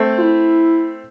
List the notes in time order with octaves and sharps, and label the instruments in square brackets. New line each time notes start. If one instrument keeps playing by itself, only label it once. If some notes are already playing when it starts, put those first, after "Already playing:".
Already playing: [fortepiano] A3 C4
[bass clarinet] F4
E4